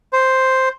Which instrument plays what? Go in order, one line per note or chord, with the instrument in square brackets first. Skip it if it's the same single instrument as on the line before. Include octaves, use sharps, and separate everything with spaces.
[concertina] C5